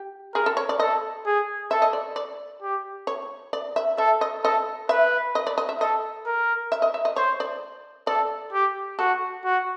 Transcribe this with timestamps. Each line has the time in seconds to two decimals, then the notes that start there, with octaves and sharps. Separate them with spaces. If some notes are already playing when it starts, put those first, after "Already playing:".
Already playing: G4
0.35 G#4 A#4
0.46 A4
0.57 C#5
0.69 D5
0.79 A4 D#5
1.26 G#4
1.71 A4 E5
1.82 D#5
1.93 D5
2.16 D5
2.62 G4
3.07 C#5
3.53 D5
3.76 E5
3.98 A4 E5
4.21 D#5
4.43 A4 D#5
4.89 B4 E5
5.35 D#5
5.47 D5
5.58 D#5
5.69 E5
5.81 A4 D#5
6.26 A#4
6.72 E5
6.82 D#5
6.94 E5
7.05 D#5
7.16 C5 C#5
7.40 D5
8.07 A4 D5
8.53 G4
8.99 F#4 A4
9.44 F#4